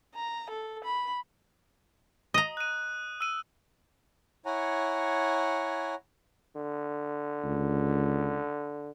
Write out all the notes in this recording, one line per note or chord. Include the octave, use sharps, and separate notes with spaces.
A#5
A4
B5
D#5 A#5 D#6
F#6 D#7
E6 D#7
E4 C#5 F#5 G#5 A#5
D3
C#2